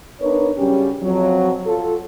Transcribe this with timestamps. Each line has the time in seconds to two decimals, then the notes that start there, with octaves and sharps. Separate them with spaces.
0.20 B3 D4 D#4 A#4 B4 C#5
0.58 C#3 F#3 G3 C#4 G4
1.02 F2 F#3
1.66 F4 A4